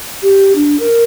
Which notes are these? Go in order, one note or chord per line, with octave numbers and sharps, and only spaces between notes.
G4
D4
A#4